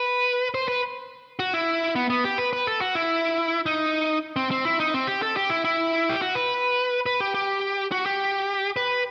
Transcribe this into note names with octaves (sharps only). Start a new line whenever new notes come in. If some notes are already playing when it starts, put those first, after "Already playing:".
Already playing: B4
C5
B4
F#4
E4
B3
B3
G4
B4
B4
A4
F#4
E4
D#4
C4
C4
E4
D#4
C4
G4
A4
G4
E4
E4
G4
F#4
B4
B4
G4
G4
F#4
G4
B4